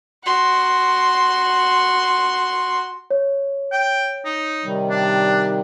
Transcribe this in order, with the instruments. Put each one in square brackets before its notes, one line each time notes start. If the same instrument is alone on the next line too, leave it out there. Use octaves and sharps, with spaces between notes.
[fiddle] F#4 C6
[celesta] C#5
[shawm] G5
D#4
[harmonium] C3 D#3 G3
[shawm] D4